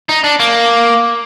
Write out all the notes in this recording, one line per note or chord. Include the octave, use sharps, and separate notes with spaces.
D#4
D4
A#3